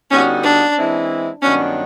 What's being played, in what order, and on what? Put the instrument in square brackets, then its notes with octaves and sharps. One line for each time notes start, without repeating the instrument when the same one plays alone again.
[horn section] D3 G3 B3 D#4 F#4 [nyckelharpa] C#4
[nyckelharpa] D4
[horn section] E3 G#3 C4 E4
[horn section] G2 D#3 F#3 B3 D4 [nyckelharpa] C#4